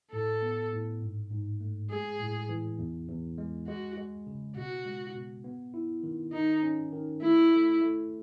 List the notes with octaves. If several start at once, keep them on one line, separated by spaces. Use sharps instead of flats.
A2 A4
B3
A2
G#2
G#2
A3
G#3 G#4
A2
E3
E2
E2
G#3
G#3 F#4
G#3
C#3
B2 F#4
G#3
B2
B3
E4
D#3
D#3 D#4
C#4
D#3
A3 E4
A3
A3